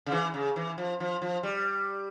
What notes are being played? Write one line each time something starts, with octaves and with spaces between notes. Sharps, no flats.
C#3
E3
C#3
E3
F3
F3
F3
G3